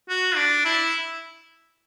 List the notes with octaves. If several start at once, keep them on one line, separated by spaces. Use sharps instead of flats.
F#4
D4
E4